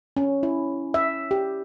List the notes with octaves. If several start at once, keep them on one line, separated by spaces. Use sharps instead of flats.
C#4
E4
E5
G4